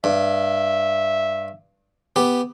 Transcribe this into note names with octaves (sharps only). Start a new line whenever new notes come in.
G2 E5
B3 G4